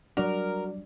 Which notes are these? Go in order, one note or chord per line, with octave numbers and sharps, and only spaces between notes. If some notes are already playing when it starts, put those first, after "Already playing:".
F#3 G3 D4 F#4 A#4 D5